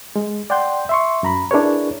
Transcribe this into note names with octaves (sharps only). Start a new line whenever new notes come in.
G#3
D5 F#5 G5 C6 G6
E5 C6 C#6
F#2 A#5 B5
D4 E4 G#4 A#4 B4 C#5